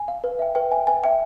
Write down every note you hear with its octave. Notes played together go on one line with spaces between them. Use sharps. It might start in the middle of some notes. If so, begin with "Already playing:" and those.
Already playing: G#5
F5
B4
E5 G5
B4 G5
E5 G5 G#5
B4 G#5
E5 G5